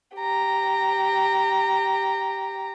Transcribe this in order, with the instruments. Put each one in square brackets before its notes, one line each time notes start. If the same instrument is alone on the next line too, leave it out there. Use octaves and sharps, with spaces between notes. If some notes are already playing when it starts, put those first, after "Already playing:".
[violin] G4 A#5